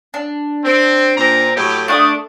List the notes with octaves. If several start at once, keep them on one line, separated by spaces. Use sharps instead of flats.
D4
C4
A#2 C4 A#5
A2 F#3 G4
A3 D4 F#5 D#6